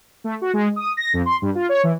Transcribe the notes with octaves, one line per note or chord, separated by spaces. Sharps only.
A3
F#4
G#3
D#6
A#6
F2
C6
G2
F4
C#5
E3